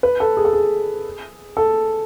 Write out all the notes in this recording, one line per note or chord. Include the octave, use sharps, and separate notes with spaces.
B4
A4
G#4
A4
G#4
A4